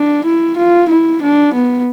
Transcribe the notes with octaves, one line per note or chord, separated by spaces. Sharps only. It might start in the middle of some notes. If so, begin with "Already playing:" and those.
Already playing: D4
E4
F4
E4
D4
B3